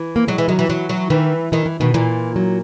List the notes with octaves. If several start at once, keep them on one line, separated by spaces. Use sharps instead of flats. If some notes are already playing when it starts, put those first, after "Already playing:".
Already playing: E3
A#3
F#3 G#3
E3
D#3 F#3
E3
E3 F#3
F#3
D#3 E3
D#3 E3
E3
B2 D#3
A#2 E3
F#3